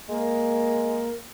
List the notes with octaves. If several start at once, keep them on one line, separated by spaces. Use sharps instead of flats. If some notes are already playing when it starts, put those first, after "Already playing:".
G#3 A#3